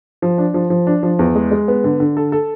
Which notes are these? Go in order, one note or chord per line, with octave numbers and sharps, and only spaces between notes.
F3
D4
F3
F3
D4
F3
E2
G#3
G#3
B3
D3
D3
A4
A4